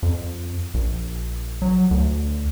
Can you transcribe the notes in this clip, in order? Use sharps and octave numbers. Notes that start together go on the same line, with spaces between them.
F2
A#1
F#3
D2